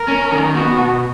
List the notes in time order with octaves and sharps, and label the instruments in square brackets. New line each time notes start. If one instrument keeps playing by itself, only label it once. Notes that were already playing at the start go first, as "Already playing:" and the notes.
Already playing: [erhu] A#4
[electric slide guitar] C#4
D#3
[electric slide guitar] B3 [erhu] F#4
[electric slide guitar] B2